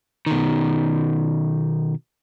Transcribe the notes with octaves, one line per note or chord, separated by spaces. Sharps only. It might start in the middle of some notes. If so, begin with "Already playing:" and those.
B2 D#3